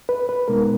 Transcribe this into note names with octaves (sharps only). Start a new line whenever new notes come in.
B4
B4
B2 G#3 B3 D#4 A#4